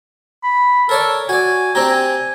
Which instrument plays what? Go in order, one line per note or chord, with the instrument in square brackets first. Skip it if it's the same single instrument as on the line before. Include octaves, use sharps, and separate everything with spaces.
[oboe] B5
[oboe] A4 [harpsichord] A#4 C#5 D5
[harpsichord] F#4 D5 [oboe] G#5
[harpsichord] C4 D4 G4 [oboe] A#5
[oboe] G#5